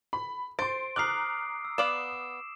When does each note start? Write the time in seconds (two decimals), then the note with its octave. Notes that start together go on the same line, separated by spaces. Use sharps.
0.13 B5
0.59 C5 C6 A6 D7
0.96 A#5 D6 D#6 F6 F#6 C7
1.65 E6
1.78 B3 D5 F5 E7